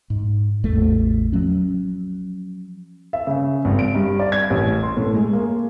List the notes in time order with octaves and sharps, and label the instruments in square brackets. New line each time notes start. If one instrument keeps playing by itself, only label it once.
[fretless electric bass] G#2
A1 E2 A3
F3 F#3 C#4
[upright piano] E5
C#3
G#1
D7
G2
D5
G#6
A1
C6
A2
G#3
A#3